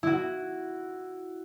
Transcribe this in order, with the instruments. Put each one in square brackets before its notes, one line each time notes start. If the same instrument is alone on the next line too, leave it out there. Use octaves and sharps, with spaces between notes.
[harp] E4 F#4